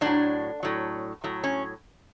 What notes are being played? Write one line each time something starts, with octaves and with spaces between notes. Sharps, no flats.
A2 F#3 D4
A2 F#3
A2 F#3
C#4